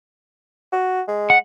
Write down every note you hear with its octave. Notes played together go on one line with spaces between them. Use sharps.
F#4
G#3
F#5